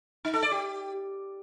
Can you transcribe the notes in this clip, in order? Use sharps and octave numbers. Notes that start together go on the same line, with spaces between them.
D#4
A4
D5
G4